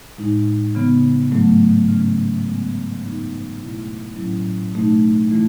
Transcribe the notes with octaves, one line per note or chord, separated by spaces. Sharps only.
A2 G#3 D#4
C#3 E3 B3
G#2 F#3 A3
C#3 E3 A3 C#4
C#3 G#3 B3
F#2 E3 B3 D#4
B2 A3 E4
A2 F#3 C#4 E4
B2 A3 D#4
E3 A3 E4